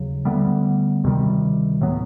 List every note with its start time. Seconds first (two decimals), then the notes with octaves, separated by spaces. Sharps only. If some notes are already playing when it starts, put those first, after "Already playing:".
Already playing: D#2 C#3 F#3
0.25 D2 D3 G3 B3
1.04 D2 C3 D#3 G3
1.81 A2 F#3 B3